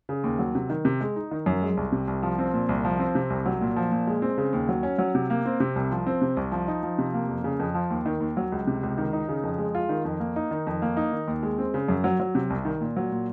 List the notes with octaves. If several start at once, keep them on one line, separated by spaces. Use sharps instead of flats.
C#3
D#2
F#3
C3
D#3
C3
G#3
D#4
D#3
F#2
G#3
C2
C3
C2
F3
C4
A#2
C2
F3
C4
C3
C2
F#3
A#2
F3
A#2
G#3
C4
C#3
D#2
F#3
C#4
F#3
C3
A#3
C4
C3
C2
F3
C4
C3
C2
F3
D#4
F3
C3
A#3
F2
C#3
F2
F3
D#2
D#3
D#2
F#3
C#2
C3
C#2
D#3
D#4
C#3
F2
G#3
F4
D#3
F2
A#3
D#4
D#3
F2
A#3
D#4
D#3
D#2
G#3
C4
C#3
F#2
F#3
F#3
C3
C2
D#3
A#2
F#3
A#2